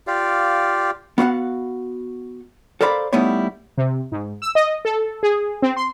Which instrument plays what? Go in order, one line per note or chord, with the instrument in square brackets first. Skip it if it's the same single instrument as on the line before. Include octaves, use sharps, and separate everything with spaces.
[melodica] F4 G4 D5 F5
[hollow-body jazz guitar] B3 F#4 F5 F#5
A4 A#4 C5 D5 F5 B5
G3 A3 B3 D#4 E4 C#5
[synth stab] C3
G#2
E6
D#5
A4
G#4
C4
C6